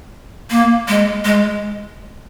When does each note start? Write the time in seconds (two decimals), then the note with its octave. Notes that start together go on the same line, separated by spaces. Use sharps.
0.51 A#3
0.88 G#3
1.25 G#3